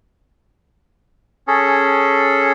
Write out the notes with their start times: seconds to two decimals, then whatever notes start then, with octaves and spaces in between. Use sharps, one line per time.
1.48 C#4 G#4 A4